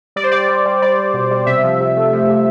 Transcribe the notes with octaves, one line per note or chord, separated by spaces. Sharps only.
G3 D5
C5
G3 D5
G3
G3
G3 D5
G3
B2
G3
C3 E5
F3
C3
A3
F3
C3